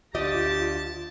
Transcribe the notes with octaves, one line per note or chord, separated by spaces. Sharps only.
D2 F4 G4 D5 D#5 A5